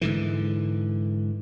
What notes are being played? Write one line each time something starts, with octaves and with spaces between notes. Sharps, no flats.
G#2 D3 E3